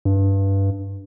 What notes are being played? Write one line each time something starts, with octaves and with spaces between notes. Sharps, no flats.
G2